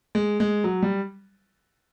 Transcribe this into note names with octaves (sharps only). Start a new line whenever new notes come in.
G#3
G#3
F#3
G3